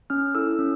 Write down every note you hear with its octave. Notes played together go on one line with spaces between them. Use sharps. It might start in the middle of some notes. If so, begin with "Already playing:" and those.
C#4 F6
E4 A4 E6
C#4